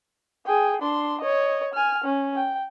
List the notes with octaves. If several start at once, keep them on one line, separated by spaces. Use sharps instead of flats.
G#4 G5
D4 C6
C#5 D#5
G#5 F6
C#4
G5